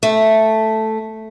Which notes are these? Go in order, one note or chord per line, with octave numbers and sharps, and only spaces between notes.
A3